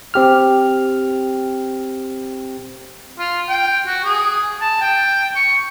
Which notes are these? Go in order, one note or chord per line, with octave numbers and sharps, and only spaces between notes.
C4 G4 F6
F4
G5
F#4
G#4
A5
G5
C#6